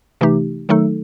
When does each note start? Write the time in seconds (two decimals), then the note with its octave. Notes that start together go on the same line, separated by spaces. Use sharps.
0.21 C3 E3 A3 D#4 G4
0.69 D#3 F#3 A3 D#4 A4